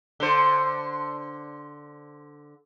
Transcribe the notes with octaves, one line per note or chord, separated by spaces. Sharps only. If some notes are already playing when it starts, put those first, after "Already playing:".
D3 C5